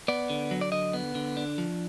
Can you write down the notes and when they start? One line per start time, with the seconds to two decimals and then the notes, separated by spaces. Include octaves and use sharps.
0.08 B3 D5
0.30 D3
0.51 F#3
0.61 D5
0.72 D3 D#5
0.93 B3
1.15 D3
1.37 D4
1.58 F3